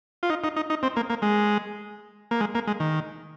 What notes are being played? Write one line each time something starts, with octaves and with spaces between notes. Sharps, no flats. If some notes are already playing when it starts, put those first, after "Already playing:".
F4
D#4
D#4
D#4
D#4
C4
A#3
A#3
G#3
A#3
G#3
A#3
G#3
D#3